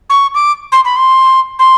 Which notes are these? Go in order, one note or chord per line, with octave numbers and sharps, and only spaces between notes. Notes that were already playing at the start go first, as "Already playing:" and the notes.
C#6
D6
C6
B5
C6
C6